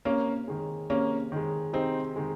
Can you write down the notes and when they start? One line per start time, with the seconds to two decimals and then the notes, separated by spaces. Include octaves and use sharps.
0.05 C3 A#3 C#4
0.48 D#3 G#3
0.90 C3 A#3 C#4
1.32 D#3 G#3
1.73 C3 C4 D#4
2.16 D#3 G#3